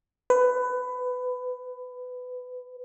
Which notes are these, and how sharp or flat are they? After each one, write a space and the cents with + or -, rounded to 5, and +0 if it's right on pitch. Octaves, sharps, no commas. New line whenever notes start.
B4 +20